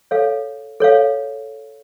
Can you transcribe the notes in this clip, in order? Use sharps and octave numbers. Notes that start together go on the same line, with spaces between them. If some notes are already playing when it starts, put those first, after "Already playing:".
A4 C#5 F5
A4 C#5 F5